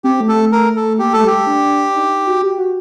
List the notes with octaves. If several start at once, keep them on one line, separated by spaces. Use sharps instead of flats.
C4 G4
A3
A4
A3
A#4
A4
A#3 G4
A3 A4
G3
A3 G4
D4
D#4
F#4
G4
F#4